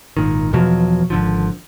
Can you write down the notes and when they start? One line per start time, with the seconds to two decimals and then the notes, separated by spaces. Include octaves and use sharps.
0.17 G#1 A#2 D#3
0.53 E2 B2 F3 F#3
1.10 G#1 D3 F3